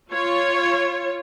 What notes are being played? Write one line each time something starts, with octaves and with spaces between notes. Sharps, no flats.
F4 C#5